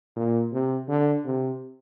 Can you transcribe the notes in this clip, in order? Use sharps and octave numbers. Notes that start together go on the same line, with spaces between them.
A#2
C3
D3
C3